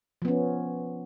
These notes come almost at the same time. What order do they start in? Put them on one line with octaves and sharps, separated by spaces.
F3 B3 C#4